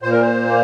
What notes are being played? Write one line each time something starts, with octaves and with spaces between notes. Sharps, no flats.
A#2 C5
A#4
C5
A#3